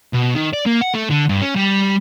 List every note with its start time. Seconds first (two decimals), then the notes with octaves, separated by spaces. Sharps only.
0.14 B2
0.35 D#3
0.53 D5
0.66 A#3
0.82 F#5
0.94 A3
1.10 D3
1.29 G2
1.41 C#4
1.56 G3